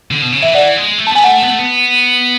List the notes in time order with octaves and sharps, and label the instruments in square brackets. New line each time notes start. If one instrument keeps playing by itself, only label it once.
[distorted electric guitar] D3
B2
C#3
[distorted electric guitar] E3 [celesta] E5
[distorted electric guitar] E3 [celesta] D5 F#5
[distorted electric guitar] G#3
A3
[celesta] A5
[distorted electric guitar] B3 [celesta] G#5
[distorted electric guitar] A3 [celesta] F#5 A5
[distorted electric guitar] B3
A3
B3